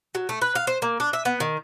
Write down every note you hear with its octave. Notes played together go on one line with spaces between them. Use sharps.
F#3
A3
B4
F5
C5
A#3
D4
E5
B3
D#3